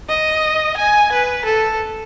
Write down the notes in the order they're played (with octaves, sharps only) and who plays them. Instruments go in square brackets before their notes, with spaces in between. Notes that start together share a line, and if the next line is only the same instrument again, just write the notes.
[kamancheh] D#5
G#5
B4
A4